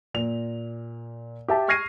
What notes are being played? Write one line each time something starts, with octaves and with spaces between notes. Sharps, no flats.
A#2 F7
G4 E5 A5
C#6 F6 G#6 A#6 C7 D#7